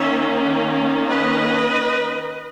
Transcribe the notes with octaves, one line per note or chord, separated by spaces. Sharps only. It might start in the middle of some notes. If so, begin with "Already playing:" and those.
Already playing: D#3 A#3 C#4 C#5 E5
B4 D#5